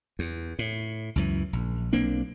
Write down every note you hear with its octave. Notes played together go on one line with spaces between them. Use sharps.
E2
A2
C#2 F#2 E3
A#1
B1 A#3 C4 D4